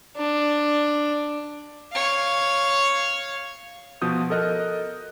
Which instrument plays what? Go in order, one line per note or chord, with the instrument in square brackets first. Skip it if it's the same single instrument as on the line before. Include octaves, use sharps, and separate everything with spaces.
[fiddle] D4
[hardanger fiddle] C#5 F5
[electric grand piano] B2 F3 D#6 G6
A4 A#4 D#5 F6 F#6